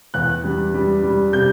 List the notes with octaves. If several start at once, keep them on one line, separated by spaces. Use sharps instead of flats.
E2 F#6
G3
G3
G3
C3 G6